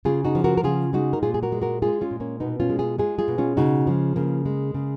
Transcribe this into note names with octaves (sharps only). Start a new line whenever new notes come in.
C#3 F4 G#4
D#4 F#4
F3
F#4 A#4
A#4
C#3 F4 G#4
G#3 D#4 F#4
A#4
A#2 F4 G#4
G#4
F#4 A#4
G#3
F#4 A#4
G#3 F4 G#4
C#4 F4
A#2
A#3 C#4
B2 B3 D#4
C#4 F4
G#3
F4 G#4
G#3 F4 G#4
F4 G#4
B2
C#4 F4
C#3 D#4 F#4
F3 G#3
C#3 A#3
G#3
C#3